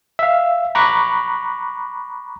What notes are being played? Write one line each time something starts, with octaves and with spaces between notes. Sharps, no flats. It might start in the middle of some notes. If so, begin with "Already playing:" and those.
E5 F5
A#5 B5 C#6 D6 F#6